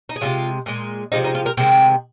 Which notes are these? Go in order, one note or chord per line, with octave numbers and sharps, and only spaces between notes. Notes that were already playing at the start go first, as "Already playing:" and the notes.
D#4
G#4
C3 F3 G#3 F4
A#2 G#3
C3 F3 G#3 D#4
D#4
F4
A#4
C3 D#3 G#3 C4